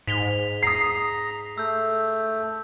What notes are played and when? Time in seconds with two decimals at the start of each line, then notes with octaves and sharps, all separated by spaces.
0.07 G#2 B6 F7 G7
0.63 A#5 D#6 C7
1.58 A3 E6 G6